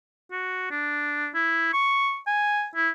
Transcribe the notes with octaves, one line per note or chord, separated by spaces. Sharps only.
F#4
D4
E4
C#6
G#5
E4